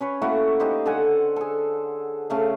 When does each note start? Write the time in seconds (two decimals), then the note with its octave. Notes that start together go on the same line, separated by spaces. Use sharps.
0.01 C#4 B4 C#5
0.22 A3 A#3 E4 F#4
0.60 D#4 G4 C5
0.86 D3 A4 F#5 G#5
1.36 G#4 A4
2.30 C#3 A3 F5